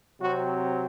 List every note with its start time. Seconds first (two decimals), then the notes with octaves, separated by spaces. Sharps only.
0.20 C3 F#3 C4 F#4